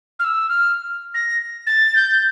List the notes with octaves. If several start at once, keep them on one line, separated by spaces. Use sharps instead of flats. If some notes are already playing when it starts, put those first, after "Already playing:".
F6
E6
F6
A#6
A6
G6